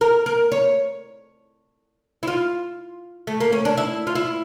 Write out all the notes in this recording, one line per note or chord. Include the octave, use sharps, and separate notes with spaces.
A#4
A#4
C#5
E4
F4
A3
A#3
C#4
D4
E4
F4
E4